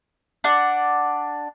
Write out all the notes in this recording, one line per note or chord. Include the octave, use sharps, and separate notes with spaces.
D4 D5 F#5